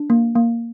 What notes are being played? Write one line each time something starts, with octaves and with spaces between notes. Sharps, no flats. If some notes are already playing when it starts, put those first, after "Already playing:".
Already playing: D4
A#3
A#3